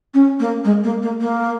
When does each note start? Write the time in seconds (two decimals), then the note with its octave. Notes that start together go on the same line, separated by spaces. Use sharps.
0.14 C#4
0.40 A#3
0.64 G#3
0.83 A#3
1.02 A#3
1.21 A#3